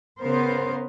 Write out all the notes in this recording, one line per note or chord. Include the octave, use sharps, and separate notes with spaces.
C#3 B3 A#4 C5